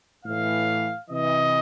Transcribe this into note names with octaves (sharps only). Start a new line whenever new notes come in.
A2 E3 F5
C3 E3 D#5